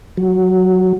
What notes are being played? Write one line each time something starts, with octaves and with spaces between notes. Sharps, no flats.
F#3